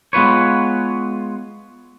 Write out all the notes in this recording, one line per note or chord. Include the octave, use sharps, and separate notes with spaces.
G#3 B3 F4 B4 C#5